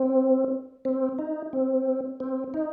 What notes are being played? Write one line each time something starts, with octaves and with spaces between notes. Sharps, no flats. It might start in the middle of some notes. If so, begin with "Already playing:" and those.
Already playing: C4
C4
D#4
C4
C4
D#4